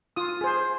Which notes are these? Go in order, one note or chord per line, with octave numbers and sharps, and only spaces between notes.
F4 D#6
G#4 C5